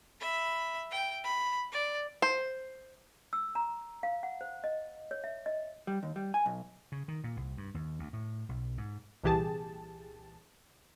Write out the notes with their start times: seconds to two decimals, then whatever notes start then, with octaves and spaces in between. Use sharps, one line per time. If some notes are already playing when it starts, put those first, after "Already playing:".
0.21 E5 B5
0.91 G5
1.23 B5
1.72 D5
2.22 C5
3.33 E6
3.55 A#5
4.03 F5
4.23 F#5
4.41 C5
4.64 D#5
5.11 C#5
5.24 E5
5.46 D#5
5.87 G3
6.03 D#2
6.16 G3
6.34 G#5
6.46 B1
6.92 C#3
7.08 D#3
7.24 A#2
7.37 C2
7.57 G2
7.74 D#2
7.99 D2
8.13 A2
8.49 B1
8.78 G#2
9.24 C2 A#2 E3 G4 G#4 A5